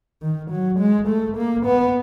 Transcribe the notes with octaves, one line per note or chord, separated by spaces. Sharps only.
D#3
F#3
G#3
A3
A#3
B3